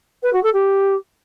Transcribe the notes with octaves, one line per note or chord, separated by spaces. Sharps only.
B4
F#4
A4
G4